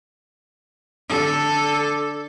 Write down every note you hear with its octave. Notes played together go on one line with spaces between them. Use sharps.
D3 A4